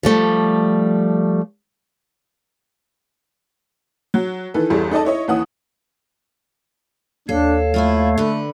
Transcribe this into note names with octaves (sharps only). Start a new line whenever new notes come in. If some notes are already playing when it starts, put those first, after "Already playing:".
F3 G3 A3
F#3
D#3 E3 A4 B4
G1 E2 G3 A4
D#4 A4 D5 D#5 A5
E4 C#5 D#5
D#2 E3 F#5 D#6
D#2 D4 A4 C#5 F5
F3 A3 E4 F4
D3 B4